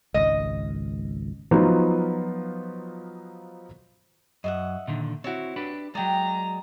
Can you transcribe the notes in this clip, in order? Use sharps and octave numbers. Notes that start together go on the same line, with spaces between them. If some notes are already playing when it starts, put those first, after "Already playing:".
G#1 C#2 D#5
F3 F#3 B3 D#4 F4
F#2 D#5 E5 F#5
A#2 D3 D#3
C4 E4 F#4 C#5
D4 G4 B4
F#3 G#3 D5 G5 A#5